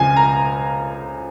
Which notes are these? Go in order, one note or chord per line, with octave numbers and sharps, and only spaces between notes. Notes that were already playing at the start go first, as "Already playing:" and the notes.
Already playing: C#2 C#3 F3 G#5
A#5